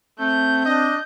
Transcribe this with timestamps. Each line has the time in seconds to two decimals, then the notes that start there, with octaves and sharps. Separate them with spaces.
0.20 A3 C4 G6
0.66 D4 D#5